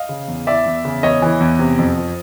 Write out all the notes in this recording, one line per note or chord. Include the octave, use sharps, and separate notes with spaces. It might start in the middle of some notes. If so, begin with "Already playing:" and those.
Already playing: D#5 F5
C#3
E2
E3 D5 E5
E2
C#3
E2 C#5 D#5
E3
E2
C3
F2
F3